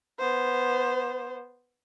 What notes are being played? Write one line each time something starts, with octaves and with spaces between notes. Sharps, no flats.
B3 C5